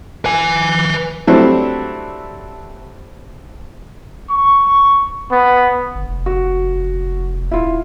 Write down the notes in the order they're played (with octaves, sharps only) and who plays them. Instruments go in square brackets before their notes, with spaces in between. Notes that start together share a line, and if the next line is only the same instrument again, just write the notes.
[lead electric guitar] B4 G#5
[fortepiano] F#3 G3 A3 C4 D4 E4
[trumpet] C#6
B3
[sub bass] G1
F1
[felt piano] F#4
[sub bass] D#1 [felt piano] E4 F4